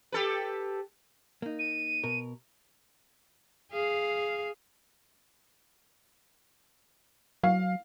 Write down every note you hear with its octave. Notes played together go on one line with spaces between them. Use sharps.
G4 A4 B4
A#3 D#4
D#7
B2 A#4
G#4 F5
F#3 F5